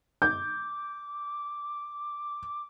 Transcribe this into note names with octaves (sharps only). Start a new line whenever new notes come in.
D6 G6